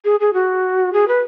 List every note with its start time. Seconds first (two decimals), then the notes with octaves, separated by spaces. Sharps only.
0.05 G#4
0.20 G#4
0.34 F#4
0.93 G#4
1.08 B4